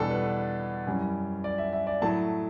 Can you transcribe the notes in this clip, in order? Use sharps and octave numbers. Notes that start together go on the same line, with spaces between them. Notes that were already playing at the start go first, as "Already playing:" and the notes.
Already playing: E2 B2 G3 D4 A4
B4
F#2 E3 G3 C#4
D5
E5
E5
D5
A2 F#3 A3 E4 A5